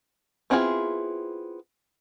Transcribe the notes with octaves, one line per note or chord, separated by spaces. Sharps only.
B3 C4 E4 F4 G#4